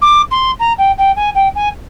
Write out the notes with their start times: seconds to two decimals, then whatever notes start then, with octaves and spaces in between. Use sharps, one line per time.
0.01 D6
0.31 C6
0.59 A#5
0.78 G5
0.98 G5
1.16 G#5
1.35 G5
1.55 G#5